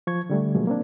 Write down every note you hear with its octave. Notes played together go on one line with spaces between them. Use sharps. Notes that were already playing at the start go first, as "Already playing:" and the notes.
F3 C#6 G#6
D3 G3 A3
B2 F3 F#3 G#3 A#3
A#3 C4 D4